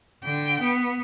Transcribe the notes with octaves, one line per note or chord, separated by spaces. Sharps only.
D3 G5
B3